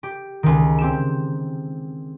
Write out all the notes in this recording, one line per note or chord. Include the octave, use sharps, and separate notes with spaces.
G4
C#2 D#3
C4 G4 E7